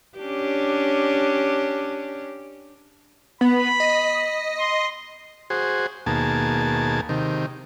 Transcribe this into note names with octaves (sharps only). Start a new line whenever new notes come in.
C#4 D4 G4
B3 B5
D#5
C6
F#4 G#4 C5
D#2 B2 A#3 G#4 A5
C3 D#3